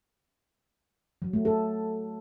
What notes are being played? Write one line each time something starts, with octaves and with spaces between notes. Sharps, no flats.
F#3
A3
A4